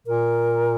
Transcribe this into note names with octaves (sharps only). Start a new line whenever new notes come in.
A#2 A#4